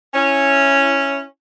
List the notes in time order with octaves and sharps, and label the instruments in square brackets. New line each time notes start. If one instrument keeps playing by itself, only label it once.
[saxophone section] C#4 E4